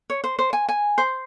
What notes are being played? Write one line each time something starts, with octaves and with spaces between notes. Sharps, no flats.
C#5
C5
C5
G#5
G#5
C5